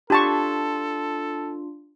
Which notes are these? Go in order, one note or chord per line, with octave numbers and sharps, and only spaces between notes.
D4 F4 G4 A4 A5 C#6